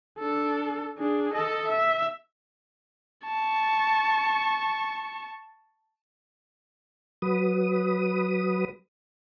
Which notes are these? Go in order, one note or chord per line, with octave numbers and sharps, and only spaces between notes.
D4 A4
D4 G#4
A4 D#5
E5
A5 C#6
F#3 B4 D#6